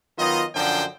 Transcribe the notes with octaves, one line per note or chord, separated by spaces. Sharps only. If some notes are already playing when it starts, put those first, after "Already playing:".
D#3 F#3 B3 F4 D#5
F#2 D3 F3 D4 C5 G5